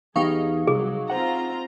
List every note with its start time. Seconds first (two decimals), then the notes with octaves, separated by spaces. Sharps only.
0.16 E2 B3 D#4 G4 G#4 F5 C#6
0.67 C2 F#3 G#4
1.10 C4 F4 C5 F#5 A#5